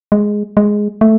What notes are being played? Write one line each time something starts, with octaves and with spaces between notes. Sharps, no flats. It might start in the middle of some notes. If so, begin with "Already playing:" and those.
G#3
G#3
A3